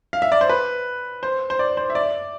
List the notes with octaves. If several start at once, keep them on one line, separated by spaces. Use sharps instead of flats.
F5
E5
D5
C5
B4
C5
C5
D5
C5
E5
D5